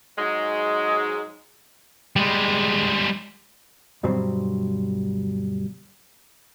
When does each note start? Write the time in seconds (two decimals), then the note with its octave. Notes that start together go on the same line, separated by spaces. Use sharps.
0.18 G#2 F#3 G#3
2.16 G3 G#3
4.03 D2 G2 B2 F#3 G3 C4